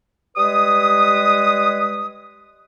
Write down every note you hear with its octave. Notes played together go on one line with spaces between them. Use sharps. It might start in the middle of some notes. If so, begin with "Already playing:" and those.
G3 G#3 B4 D#6